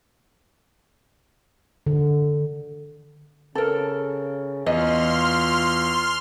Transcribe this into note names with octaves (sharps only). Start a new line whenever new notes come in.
D3
C#3 A4 A#4
E2 F4 D#5 C6 F6